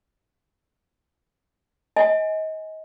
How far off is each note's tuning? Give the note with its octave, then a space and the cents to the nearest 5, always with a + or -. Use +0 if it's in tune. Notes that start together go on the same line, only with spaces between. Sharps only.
D#5 +25 G#5 +0